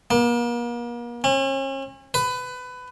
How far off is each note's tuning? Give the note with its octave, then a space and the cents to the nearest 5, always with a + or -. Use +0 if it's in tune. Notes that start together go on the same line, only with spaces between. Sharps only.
A#3 +40
C#4 -40
B4 +20